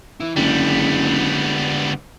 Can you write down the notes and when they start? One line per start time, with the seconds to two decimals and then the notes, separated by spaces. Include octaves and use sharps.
0.20 E3 E4
0.36 F#1 D3 G3 G#3 B3